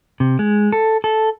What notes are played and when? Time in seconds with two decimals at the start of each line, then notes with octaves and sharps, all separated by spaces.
0.20 C3
0.39 G#3
0.72 A4
1.04 A4